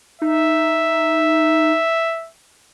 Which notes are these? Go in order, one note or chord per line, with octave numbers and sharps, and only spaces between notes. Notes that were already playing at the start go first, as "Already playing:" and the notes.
D#4 E5